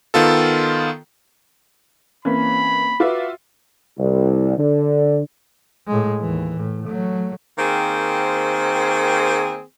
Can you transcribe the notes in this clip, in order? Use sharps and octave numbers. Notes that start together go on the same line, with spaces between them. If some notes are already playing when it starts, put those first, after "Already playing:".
D#3 B3 F4 A4
E3 A#3 C4 C#4 B5
F4 F#4 B4 E5 D6
C2
D3
A2 G#3
D#2 E3
A2
F#3 A3
D#3 A#3 C4 G#4 C5